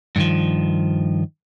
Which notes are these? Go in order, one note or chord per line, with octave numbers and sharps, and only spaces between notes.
G2 D#3 F3